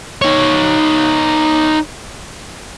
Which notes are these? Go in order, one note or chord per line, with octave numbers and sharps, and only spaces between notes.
D#4 C#5